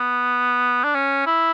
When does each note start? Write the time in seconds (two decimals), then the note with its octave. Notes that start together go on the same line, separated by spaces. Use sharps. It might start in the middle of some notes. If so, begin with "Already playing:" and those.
Already playing: B3
0.84 D4
0.95 C#4
1.26 E4